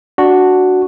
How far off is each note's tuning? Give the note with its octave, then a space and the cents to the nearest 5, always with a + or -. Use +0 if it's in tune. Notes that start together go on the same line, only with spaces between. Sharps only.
D4 +0 F#4 +0